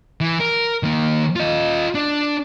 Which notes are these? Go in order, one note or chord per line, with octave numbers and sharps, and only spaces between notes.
E3
A#4
D#3 A#3
F4 D#5
D4